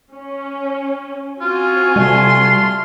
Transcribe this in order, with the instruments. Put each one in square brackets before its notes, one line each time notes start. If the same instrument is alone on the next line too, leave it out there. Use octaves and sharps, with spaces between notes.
[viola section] C#4
[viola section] C4 F#4 G#5 [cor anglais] F4
[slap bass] C3 G3 [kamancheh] A3 C6